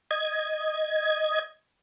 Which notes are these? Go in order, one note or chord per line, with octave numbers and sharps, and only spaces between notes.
D#5 G#6